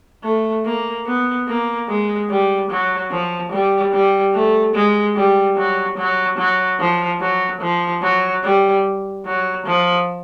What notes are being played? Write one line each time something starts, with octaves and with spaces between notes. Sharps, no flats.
A3
A#3
B3
A#3
G#3
G3
F#3
F3
G3
G3
A3
G#3
G3
F#3
F#3
F#3
F3
F#3
F3
F#3
G3
F#3
F3